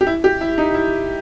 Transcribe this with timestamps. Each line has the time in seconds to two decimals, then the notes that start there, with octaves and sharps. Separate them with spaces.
0.01 G4
0.07 E4
0.24 G4
0.41 E4
0.58 D#4
0.74 E4